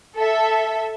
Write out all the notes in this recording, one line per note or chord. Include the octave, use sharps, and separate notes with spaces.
A4 E5